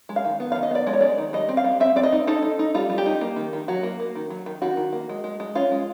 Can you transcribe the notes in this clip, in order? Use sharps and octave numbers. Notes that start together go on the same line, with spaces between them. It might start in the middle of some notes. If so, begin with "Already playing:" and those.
G#3
F5
D#3
B3
D#3 F5
D#5
B3 D5
G#3 D5
C#5
G#3 D5
D#3
G3 D#5
C4
F5
G3
C4 E5
C4 D5
D#5
D#4
D#4 A4
D#4
D#4
G3 F4
G3
G4
D#4
A#3
D#3
D#3
F#3 F#4
A#3
A#3
D#3
F#3
D#3
D#3 F#4
D#3
A#3
G#3
G#3
G#3
C#4 F4
G#3